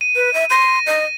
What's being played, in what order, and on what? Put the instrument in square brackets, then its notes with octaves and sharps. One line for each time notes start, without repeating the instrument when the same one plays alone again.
[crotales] D#7
[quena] B4
E5
[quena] C6 [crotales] A#6 D#7
[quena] D#5